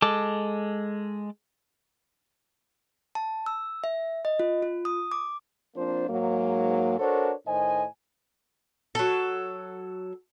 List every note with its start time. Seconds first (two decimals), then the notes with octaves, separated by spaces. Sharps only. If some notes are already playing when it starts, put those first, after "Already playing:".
0.02 G#3 A4 A5 D6
3.15 A5
3.46 E6
3.84 E5
4.25 D#5
4.40 F4
4.62 F4
4.85 D#6
5.12 D6
5.76 F3 A#3 C4 D4 F4 C5
6.09 G#2 F#3 A#3
6.99 D4 F#4 A4 A#4 C5 C#5
7.47 A2 D#3 C5 D#5 G#5
8.95 F#3 A4